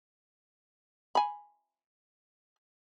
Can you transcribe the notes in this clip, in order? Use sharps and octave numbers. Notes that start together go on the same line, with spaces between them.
G#5 B5